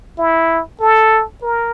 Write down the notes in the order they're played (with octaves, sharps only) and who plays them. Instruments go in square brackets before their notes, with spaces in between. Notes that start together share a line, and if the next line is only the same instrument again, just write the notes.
[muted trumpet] E4
A4
A#4